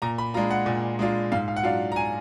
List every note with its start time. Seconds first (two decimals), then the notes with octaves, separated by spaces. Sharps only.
0.02 A#2 A#5
0.18 B5
0.34 G#3 D4 F4 A#5
0.51 F#5
0.66 A#2
0.99 G#3 D4 F4
1.32 G#2 F5
1.48 F5
1.56 F#5
1.63 F#3 D4 F4 F5
1.92 A#5
1.96 G#5